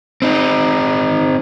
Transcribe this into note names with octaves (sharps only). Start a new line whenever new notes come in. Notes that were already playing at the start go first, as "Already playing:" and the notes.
C4 D#4